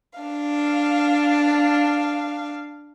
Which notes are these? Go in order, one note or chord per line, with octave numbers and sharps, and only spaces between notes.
D4 F5